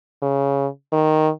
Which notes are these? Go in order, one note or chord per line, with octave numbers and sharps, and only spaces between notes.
C#3
D#3